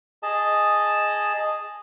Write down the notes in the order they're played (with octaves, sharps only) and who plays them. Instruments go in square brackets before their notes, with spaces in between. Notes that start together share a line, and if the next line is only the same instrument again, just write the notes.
[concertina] G#4 D#5 A5